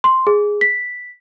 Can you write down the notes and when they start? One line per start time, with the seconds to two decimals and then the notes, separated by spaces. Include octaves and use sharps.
0.04 C6
0.27 G#4
0.61 B6